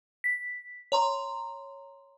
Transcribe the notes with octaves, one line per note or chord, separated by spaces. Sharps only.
B6
C#5 A#5 C6